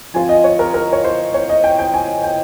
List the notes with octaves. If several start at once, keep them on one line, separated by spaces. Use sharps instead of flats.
F3 C4 F4 G#5
D#5
C#5
A#4
A#4
C#5
C5
C#5
D#5
G5
G5
G#5
G5